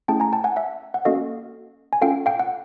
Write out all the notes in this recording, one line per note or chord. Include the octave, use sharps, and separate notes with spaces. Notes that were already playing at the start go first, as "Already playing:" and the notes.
A3 C#4 E4 G#4 G5 A5
G#5 A#5
G5 A5
F#5 G#5
E5 F#5
F#5
A#3 C#4 F#4 A4 D#5 F5
G#5
C#4 F4 A4 F5 G5
F5 G5
F#5